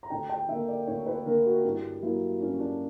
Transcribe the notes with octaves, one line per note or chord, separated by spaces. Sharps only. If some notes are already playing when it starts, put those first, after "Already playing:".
A#5
D2 G5
G5
D3 A#3 E5
D5
D2 C#5
B4
D3 A#3 A#4
F#4
G2 E4
F#3 A#3 E4
G2 C#4
D4